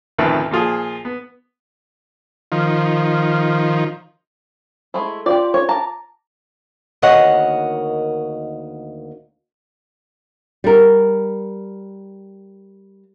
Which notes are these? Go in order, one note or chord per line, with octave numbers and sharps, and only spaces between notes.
A1 D2 C3 D#3 F3 B4
A#2 F3 F4 G#4
B3
D#3 F3
G#3 A3 E4
F4 G4 D5 D6
C#5
A5 A#5 D6
D2 D#3 A#3 C#5 D#5 F#5
G3 A#4